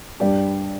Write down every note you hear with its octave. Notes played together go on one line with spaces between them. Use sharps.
G2 G3 D4 G4 D5